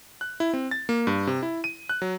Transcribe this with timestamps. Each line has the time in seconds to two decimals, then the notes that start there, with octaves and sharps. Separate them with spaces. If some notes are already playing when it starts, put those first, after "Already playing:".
0.21 F#6
0.40 E4
0.53 C4
0.71 A6
0.89 A#3
1.07 G2
1.27 C3
1.43 E4
1.64 D#7
1.89 F#6
2.02 F#3